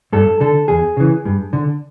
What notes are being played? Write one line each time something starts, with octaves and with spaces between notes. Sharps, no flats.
G2 A4
D3 A4
E2 G#4
C#3 E3
G2
D3